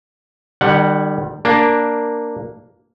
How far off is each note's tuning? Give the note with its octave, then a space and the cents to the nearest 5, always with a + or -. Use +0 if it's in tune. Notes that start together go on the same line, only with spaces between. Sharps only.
D#3 -45 G3 +0 F#5 +0
A#3 +0 D4 +0